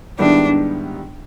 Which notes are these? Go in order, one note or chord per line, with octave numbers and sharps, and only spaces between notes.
G#2 D#3 G3 B3 D4 E4